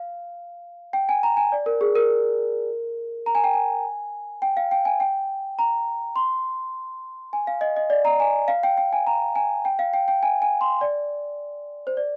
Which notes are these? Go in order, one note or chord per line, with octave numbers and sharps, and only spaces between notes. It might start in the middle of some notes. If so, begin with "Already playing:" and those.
Already playing: F5
G5
G#5
A#5
G#5
D5
A#4
G#4
A#4
A#5
G#5
G5
G#5
G5
F5
G5
G#5
G5
A#5
C6
G#5
F5
D#5
D#5
D5
A#5
G#5
F5
G5
G5
G#5
A#5
G#5
G5
F5
G5
G5
G#5
G#5
C6
D5
C5
D5